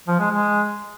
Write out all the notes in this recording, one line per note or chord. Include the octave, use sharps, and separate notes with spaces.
F3
G#3
G#3